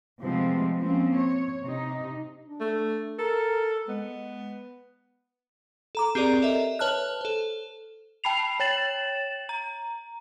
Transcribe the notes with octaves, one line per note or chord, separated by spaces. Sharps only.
C3 F3 G#3 A3 B3 C4
F3 A#3 C4 C#4
C#5
C3 D#4
D4
A3
A4 A#4
G#3 B3
A4 A#5 D6
C4 G4 G#4 A#4 D5 A#5
A4 A#4 D#5 E5
B4 C#5 A5 F6 F#6
A4 C5
G5 A5 B5 C7 F7
C#5 G5 A6 E7 F#7
A#5